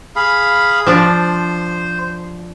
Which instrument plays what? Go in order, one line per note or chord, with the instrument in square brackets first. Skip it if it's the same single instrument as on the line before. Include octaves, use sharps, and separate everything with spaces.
[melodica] G#4 F5 B5
[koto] F3 D4 [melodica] C5